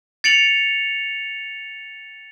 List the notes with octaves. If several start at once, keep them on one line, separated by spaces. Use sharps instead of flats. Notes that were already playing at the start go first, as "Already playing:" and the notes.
A6 C#7 D7 F7 F#7